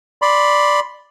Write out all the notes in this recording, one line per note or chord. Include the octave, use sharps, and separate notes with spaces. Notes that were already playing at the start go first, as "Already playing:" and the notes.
D5 B5 C6